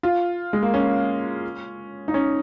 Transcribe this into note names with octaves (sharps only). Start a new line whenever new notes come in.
F4
G#3
A#3
C#4
D#4
C#4